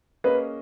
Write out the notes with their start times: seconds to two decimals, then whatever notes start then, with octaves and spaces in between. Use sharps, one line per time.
0.24 A#3 C#4 G#4 B4 D#5